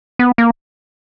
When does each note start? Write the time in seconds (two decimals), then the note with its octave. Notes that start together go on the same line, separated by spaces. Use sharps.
0.19 B3
0.38 A#3